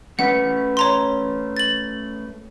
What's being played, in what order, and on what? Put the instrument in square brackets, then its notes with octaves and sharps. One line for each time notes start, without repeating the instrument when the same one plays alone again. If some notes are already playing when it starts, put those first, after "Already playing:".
[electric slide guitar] A3 C#4 B4 [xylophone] F#5
[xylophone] C#5 A#5 C6
A6 F#7